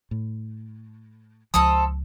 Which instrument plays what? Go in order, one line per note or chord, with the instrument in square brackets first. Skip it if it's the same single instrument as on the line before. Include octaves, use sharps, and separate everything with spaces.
[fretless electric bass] A2
[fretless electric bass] C#2 F3 [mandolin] C4 A4 D#6